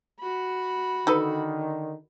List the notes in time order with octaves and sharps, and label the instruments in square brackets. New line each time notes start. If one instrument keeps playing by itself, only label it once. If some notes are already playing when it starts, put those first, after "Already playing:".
[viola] F#4 B5
[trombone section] D3 D#3 [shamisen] D#4 A4 B4